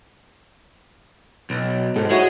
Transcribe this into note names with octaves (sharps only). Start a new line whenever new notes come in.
B1
G#2 A4
G#3 E4 F#4 G#4 C#5